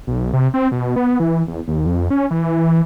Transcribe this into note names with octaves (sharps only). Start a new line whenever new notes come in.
B1
C3
C4
B2
B3
E3
E2
D#2
F2
C#4
E3